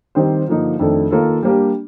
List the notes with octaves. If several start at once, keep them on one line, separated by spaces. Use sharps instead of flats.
D#3 G3 C4 G4 C5
G2 D3 F3 A#3 D#4
F2 D#3 A3 D4 A4
D#3 A#3 F4 A4
G3 A#3 D4 G4